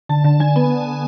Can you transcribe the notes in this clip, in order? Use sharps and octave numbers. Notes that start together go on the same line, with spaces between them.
D3 A5
D3
D3 G#5
B3